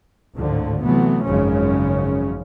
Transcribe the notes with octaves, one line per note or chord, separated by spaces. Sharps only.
G#1 D2 A2 D3 F3
C3 E3 F#3 A3 B3
G#1 F#2 C#3 F3 G#3 C#4